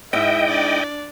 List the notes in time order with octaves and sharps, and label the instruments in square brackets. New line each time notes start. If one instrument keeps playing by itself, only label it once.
[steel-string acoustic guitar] G#2 E4 [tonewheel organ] D#5 G5 [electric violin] E5
[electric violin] D4 D5